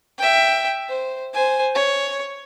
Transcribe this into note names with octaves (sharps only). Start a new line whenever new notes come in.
E5 G5
C5
C5 G#5
C#5